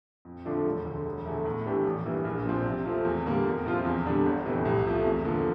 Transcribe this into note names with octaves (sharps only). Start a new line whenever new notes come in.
F2
D3 F3 A3 D4
E1
D2 D3
E1
E2 D3 A3
A2
E3 A3 D4 G4
A1
G2 E3 A#3
A#1
A#2 F3 C4
C3
F3 A3 C4
E2
D3 G3 A#3
F2
C3 F3 C4 F4
E2
D3 G3 D4
G1
F2 C3 E3 A3
C2
C3 F3 A3
E2
D3 F3 A#3